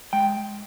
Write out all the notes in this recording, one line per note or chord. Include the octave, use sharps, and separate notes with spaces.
G#3 G5